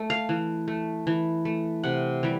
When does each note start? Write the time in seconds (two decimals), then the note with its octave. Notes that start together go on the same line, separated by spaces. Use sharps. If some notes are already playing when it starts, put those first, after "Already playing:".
Already playing: A3
0.10 F5
0.29 E3
0.68 A3
1.07 E3
1.45 A3
1.84 C3 F#5
2.23 E3 G3